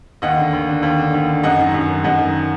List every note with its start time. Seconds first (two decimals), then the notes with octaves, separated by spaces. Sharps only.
0.22 D#2 D#5 F#5
0.38 D3
0.53 D#2
0.69 D3
0.83 D#2
0.98 D3
1.14 D#2
1.29 D3
1.43 F#2 D#5 F#5
1.59 D#3
1.74 F#2
1.89 D#3
2.04 F#2 D#5 F#5
2.19 D#3